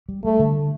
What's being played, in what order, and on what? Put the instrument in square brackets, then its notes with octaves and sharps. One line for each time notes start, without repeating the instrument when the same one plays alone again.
[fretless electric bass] G3
[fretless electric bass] G3 [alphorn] A3
[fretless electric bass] D3